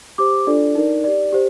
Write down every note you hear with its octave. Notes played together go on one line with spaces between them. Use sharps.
G4 C5 D6
D4 F4 A4 D5
D#4 A#4 D5
G4 D5
G4 C5